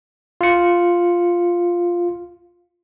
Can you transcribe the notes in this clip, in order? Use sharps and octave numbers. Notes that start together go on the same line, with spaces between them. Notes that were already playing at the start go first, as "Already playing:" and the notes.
F4 C#7